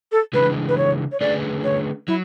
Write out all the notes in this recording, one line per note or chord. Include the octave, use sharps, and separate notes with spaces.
A4
C#3 E3 G#3 D4 B4
B4
C#5
C#5
D3 A3 C#4 G#4 B4 D5
C#5
F#3 E4